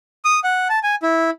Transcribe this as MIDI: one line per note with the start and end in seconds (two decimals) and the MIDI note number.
0.25 0.40 87
0.44 0.68 78
0.69 0.79 81
0.83 0.95 80
1.03 1.30 64